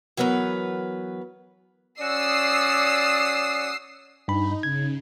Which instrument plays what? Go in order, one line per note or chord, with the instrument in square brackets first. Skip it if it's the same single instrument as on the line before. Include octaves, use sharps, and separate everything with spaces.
[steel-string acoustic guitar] E3 F#3 B3 A#4 B4
[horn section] C#4 F#4 D5 [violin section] D#6 E6 C7
[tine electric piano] G2 B5 [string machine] D#4
[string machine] C#3 [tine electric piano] G#6